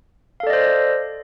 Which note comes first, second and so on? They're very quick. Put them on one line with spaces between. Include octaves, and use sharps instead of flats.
F5 A4 D5 D#5 C5